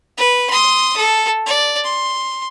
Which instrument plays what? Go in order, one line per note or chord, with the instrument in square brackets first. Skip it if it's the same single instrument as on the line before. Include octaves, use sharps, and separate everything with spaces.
[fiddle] B4
C6 D#6
A4
D5
C6